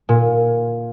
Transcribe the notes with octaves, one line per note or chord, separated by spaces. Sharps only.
A#2